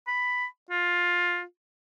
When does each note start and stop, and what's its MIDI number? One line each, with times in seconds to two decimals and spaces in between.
0.07 0.45 83
0.71 1.43 65